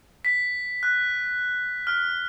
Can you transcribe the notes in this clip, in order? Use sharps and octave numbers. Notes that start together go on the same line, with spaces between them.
B6
F#6
F6